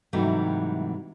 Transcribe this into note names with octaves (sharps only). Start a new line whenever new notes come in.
G#2 C3 E3 F#3 G3 A3